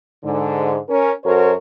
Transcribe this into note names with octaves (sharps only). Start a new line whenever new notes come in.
G#2 D3
C#4 A#4
F#2 F#4 A4 A#4 C5 C#5